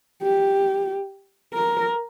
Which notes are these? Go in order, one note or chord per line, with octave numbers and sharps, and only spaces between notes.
G4
A#4